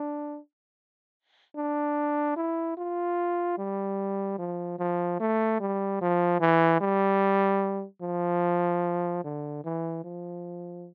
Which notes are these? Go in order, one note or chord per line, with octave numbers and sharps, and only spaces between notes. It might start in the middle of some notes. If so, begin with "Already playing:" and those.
Already playing: D4
D4
E4
F4
G3
F3
F3
A3
G3
F3
E3
G3
F3
D3
E3
F3